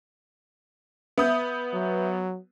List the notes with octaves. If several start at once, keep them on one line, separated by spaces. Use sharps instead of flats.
B3 E5 D#6 G6
F#3